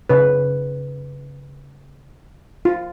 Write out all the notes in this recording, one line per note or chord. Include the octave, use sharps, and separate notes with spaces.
C#3 B4
F4